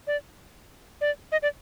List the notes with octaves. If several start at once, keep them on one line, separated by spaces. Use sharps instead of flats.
D5
D5
D#5
D5